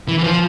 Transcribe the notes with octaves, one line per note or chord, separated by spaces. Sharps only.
E3
E3
F3